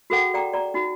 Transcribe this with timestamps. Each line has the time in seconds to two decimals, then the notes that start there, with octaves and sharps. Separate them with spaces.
0.10 F#4 G#4 A4 F#5 G5
0.34 D5 G5 A#5 D6
0.53 D5 A#5
0.74 D#4 F#4